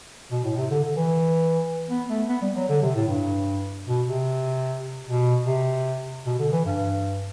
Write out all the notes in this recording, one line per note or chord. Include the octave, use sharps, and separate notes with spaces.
B2
A2
C3
D3
D3
E3
B3
A3
B3
G3
F#3
D3
C3
A2
G2
B2
C3
B2
C3
B2
D3
E3
G2